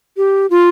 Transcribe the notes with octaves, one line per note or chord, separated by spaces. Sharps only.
G4
F4